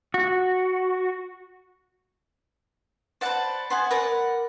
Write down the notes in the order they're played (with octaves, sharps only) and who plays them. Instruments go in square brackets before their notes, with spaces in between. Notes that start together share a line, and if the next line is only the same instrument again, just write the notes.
[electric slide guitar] F#4
[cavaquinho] B4 D5 [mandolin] C5 F#5 A5
[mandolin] B3 [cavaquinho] C5 F#5 G#5
[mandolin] A#4 [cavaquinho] B4 D5 F#5